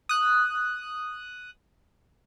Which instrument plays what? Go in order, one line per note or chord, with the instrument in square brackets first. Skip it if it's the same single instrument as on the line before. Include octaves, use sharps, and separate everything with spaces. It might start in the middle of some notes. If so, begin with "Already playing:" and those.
[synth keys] D#6 F#6